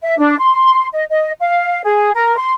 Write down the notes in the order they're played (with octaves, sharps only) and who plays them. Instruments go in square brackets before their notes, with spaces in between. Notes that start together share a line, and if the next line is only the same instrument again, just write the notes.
[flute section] E5
D4
C6
D#5
D#5
F5
G#4
A#4
C6